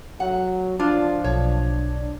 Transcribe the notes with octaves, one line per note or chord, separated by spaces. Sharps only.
F#3 F#5
F3 D4 F4
B1 C#5